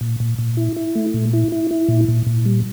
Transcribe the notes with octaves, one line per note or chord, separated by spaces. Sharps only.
A#2
A#2
A#2
E4
E4
A3
A#2
E4
E4
E4
A#2
A#2
A#2
G3